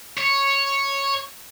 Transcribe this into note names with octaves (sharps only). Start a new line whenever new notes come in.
C#5